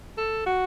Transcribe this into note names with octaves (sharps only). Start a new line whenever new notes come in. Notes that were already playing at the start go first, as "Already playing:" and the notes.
A4
F#4